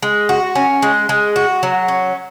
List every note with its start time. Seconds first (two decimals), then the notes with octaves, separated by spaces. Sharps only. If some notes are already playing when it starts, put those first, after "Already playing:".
0.02 G#3
0.29 F#4
0.55 C#4
0.82 G#3
1.09 G#3
1.36 F#4
1.63 F#3
1.88 C#4